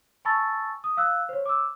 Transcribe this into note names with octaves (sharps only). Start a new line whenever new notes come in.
G#5 A5 B5 C#6 E6 A6
D#6
F5 E6 F#6
C5 C#5
D6 E6